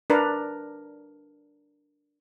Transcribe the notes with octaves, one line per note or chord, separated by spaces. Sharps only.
D4 A#4 B4